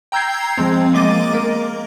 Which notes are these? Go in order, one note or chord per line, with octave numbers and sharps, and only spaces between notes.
G5 A#5 E6 G6 G#6 C7
F3 G#3 C4
G#3 A#3 D#5 D6 A6 D#7
A#3 A#4